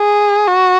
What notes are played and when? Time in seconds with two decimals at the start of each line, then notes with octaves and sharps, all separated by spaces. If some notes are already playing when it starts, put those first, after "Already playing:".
Already playing: G#4
0.47 F#4